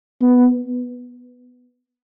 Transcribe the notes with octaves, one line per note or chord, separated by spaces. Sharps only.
B3